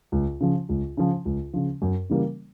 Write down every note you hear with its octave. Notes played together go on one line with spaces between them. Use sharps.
C#2
C#3 F3
C#2
C#3 F3
C#2
C#3 F3
F#2
C#3 E3 G3 A#3